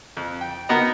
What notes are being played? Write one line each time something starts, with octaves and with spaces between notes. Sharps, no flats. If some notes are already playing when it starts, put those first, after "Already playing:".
F2
G5
B3 D#4 F#4 A#4 D#5 A#5